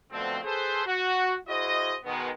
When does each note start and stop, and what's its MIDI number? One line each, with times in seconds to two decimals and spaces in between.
0.12 0.38 47
0.12 0.38 50
0.12 0.38 53
0.12 0.38 57
0.12 0.38 60
0.43 0.82 68
0.43 0.82 69
0.43 0.82 71
0.43 0.82 72
0.86 1.35 66
1.47 1.95 64
1.47 1.95 66
1.47 1.95 68
1.47 1.95 72
1.47 1.95 75
2.05 2.29 47
2.05 2.29 51
2.05 2.29 56
2.05 2.29 59